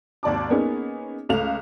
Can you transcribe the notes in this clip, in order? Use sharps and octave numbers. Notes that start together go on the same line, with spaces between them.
G#1 D#2 D5 A5 D6
A#3 B3 C#4 D#4 G#4
C#2 A3 F5 F7